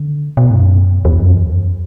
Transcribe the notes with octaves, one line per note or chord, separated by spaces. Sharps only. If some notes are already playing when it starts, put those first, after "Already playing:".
Already playing: D3
B2
A2
F#2
E2
F#2
E2
F#2